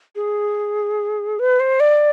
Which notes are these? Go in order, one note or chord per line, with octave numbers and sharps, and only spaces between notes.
G#4
B4
C5
D5